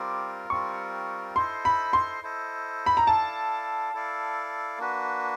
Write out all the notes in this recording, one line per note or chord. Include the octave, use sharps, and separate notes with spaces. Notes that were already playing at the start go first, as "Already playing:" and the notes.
Already playing: G3 C4 F4 A#4 D6
G3 C4 F4 A#4 C#6
E4 A4 C5 D#5 C6
B5
C6
E4 A4 C5 D#5
B5
A#5
E4 A4 D5 F5 A5
E4 A4 D5 F5
A#3 D4 F#4 B4